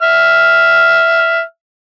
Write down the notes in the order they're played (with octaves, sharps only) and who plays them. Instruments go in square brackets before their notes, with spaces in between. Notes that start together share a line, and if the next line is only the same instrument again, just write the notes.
[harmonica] E5 F6